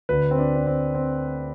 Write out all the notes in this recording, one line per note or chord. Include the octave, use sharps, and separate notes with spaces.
D2 D3 B4
C4
D4
D4
C4
C4